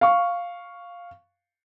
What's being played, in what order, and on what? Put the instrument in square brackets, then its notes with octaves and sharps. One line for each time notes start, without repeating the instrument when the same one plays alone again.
[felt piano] F5 C#6